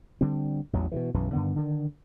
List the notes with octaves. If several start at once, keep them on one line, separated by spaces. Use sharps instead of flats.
D3 G3 C4
A1 E2 F#3
B2 D3 E3
B1 F#2 E3
G2 D3 D#3 B3
D3 D#3